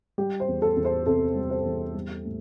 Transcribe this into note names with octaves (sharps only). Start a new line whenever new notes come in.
G3 G4
C5
E2
A4
E2
C5
C3 A4
G3
C5
E2
G3
A2